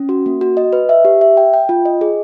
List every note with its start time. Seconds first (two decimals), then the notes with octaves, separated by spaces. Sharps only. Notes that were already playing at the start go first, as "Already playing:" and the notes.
Already playing: C#4
0.09 F#4
0.26 A#3
0.41 F#4
0.57 D#5
0.73 B4
0.89 E5
1.05 G4
1.21 E5
1.37 G5
1.54 G5
1.69 F4
1.85 D#5
2.01 G#4